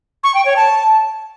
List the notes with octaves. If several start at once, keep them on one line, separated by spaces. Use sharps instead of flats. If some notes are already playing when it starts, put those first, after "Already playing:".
C#6
G5
C#5
A5